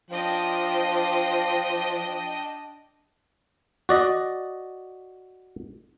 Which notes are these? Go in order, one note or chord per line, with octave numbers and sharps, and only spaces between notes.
F3 D4 D#5 G5
F#4 D5 D#5